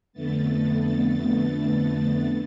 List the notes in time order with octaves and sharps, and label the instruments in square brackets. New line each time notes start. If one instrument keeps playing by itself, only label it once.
[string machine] F2 D3 A3 B3 A6